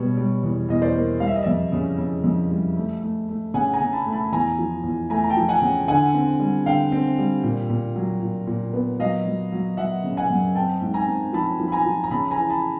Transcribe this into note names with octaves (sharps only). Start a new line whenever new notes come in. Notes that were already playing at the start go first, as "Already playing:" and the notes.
Already playing: B2 G3 B4 C#5
G3
E2
E2 D#5
C5 D5
A#3
G3 F5
E5
D#5
F2 D5 E5
C#3
C#3
F2
G3
A3
A3
A3
C#3 F#5 G#5
G#5 A#5
C#3
A5 B5
A3
A5 B5
E2 G#5 A#5
F3
E2
A3 G#5 A#5
A#5
G5 A5
F3
F#5 G#5
C#3
D3 F#5 G#5
C4
G3
D3 F5 G5
C4
G3
A#2
A#2
F#3
A#2
A#2
B3
F#3 D#5 F5
F#3
F#3
F#3 E5 F#5
C#3
F#5 G#5
F#2
C4 G5 A5
G#2
G#5 A#5
C4
F3 A5 B5
F3
B5
G#5 A#5
F3
A#5
C#3 A5 B5
G#5 A#5
E3
A5 B5